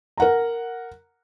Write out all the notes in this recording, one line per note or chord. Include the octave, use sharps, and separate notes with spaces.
A#4 F#5 A#5